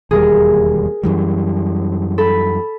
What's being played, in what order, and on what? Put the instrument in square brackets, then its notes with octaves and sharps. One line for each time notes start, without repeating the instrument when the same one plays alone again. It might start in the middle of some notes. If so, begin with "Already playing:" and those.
[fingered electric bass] E1 D#2 G3 [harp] G#4 A#4
[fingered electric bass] F#2 E3 G3
[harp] A4 B5